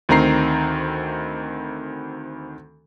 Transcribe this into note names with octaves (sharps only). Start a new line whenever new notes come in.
D2 D#3 C4 A#5 C7